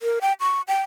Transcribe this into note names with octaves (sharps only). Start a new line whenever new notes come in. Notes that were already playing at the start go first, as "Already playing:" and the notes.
A#4
G5
C#6
G5